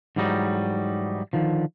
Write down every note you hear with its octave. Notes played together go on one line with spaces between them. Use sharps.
G#2 E3 F#3 G3 D#4
D3 D#3 F3